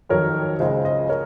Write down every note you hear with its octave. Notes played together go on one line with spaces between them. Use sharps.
F2 D#3 F#3 A#4 C#5
C#2 C#3 F3 C5 D#5
C5 D#5
A#4 C#5